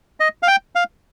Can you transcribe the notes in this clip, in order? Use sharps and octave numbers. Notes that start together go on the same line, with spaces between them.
D#5
F5
G5
F5